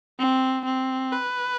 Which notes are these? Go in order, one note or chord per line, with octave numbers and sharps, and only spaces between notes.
C4
C4
B4